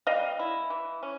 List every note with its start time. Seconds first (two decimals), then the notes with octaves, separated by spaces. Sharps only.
0.07 G3 D#5 F5
0.39 E4
0.70 E3
1.03 C#4